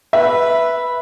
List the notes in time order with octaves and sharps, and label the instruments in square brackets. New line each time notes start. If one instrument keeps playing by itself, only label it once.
[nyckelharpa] B4 [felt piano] E5